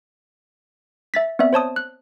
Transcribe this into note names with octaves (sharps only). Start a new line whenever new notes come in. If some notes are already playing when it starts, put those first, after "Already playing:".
E5 A6 B6
B3 C4 D5 E5
C5 C#5 A5 D#6
F#6